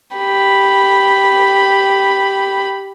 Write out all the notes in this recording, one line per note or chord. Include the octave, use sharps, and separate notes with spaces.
G4 B5